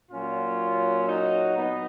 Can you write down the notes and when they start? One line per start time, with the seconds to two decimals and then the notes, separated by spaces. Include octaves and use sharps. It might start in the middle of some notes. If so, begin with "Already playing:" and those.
0.11 A#2 F#3 C#4 F4
1.08 D#4 F#4
1.57 B3 D#4